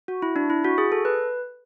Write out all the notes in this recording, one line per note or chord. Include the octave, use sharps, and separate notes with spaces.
F#4
E4
D4
E4
F#4
G#4
A4
B4